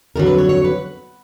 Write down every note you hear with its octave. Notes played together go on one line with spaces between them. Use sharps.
F2 D3 F#3 A#4
B4
C#5
C#5
B4